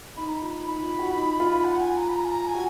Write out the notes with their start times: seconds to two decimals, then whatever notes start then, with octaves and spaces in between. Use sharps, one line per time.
0.17 D#4 B5
0.28 A#5
0.40 F4 B5
0.66 D#4 B5
0.83 F4
0.99 F#4
1.16 D#4
1.40 F4
1.64 F#5
1.81 G#5
1.97 A#5
2.09 B5
2.14 A#5
2.25 G#5
2.30 A#5
2.47 G#5
2.54 F#4